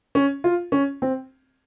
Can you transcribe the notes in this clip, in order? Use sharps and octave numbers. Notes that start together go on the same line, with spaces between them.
C#4
F4
C#4
C4